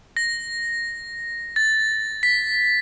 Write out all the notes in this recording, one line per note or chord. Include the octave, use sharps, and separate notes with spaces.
A#6
A6
B6